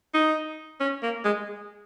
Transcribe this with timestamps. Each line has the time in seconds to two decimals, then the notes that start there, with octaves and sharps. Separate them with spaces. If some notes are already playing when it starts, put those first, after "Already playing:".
0.14 D#4
0.81 C#4
1.03 A#3
1.24 G#3